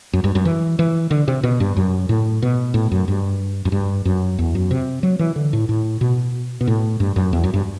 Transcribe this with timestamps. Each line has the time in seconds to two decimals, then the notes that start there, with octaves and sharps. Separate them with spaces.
0.13 F#2
0.24 G2
0.35 F#2
0.45 E3
0.79 E3
1.11 D3
1.28 C3
1.44 B2
1.60 G2
1.77 F#2
2.09 A2
2.42 B2
2.74 A2
2.91 F#2
3.08 G2
3.65 F#2
3.72 G2
4.05 F#2
4.39 E2
4.55 F#2
4.71 C3
5.03 F#3
5.19 E3
5.36 D3
5.53 A2
5.69 A2
6.01 B2
6.61 B2
6.67 A2
7.00 G2
7.16 F#2
7.33 E2
7.44 F#2
7.54 G2